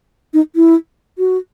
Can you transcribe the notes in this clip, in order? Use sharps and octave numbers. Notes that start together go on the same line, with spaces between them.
D#4
E4
F#4